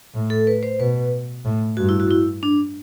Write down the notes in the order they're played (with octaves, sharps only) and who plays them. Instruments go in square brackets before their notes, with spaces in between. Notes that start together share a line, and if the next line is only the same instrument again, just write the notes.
[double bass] A2
[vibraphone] A4
B4
C5
[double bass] B2 [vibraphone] B4
[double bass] A2
[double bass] G2 [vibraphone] F#4
[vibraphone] E4
F#4
E4
D4